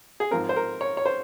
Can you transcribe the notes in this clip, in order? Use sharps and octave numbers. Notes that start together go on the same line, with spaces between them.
G#4
G#2 F3 C4 A#4
C5
A#4
C#5
C#5
C5